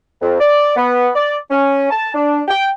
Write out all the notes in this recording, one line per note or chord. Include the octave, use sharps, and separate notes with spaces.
F2
D5
B3
D5
C#4
A5
D4
G5